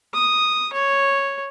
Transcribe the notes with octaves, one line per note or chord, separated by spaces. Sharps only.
D#6
C#5